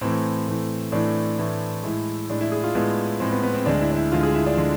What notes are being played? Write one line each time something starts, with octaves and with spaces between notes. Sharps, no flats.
A2 E3 A3 C4
A2 E3 A3
A2 E3 A3 D4
A2 E3 A3 E4
A2 G#3 E4
A2 G#3 D4
E4
G#4
F4
A2 G#3 B3
A2 G#3 C4
B3
B3
C4
D2 D3 G#3 D4
E4
D4
E4
D2 D3 G#3 F4
G#4
E4
D4
D3 G#3